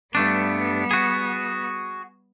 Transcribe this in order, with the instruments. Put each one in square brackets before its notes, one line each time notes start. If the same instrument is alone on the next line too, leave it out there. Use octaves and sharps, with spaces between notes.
[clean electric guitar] G2 A3 D4 [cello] G3 B3
[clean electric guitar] F#4 G#4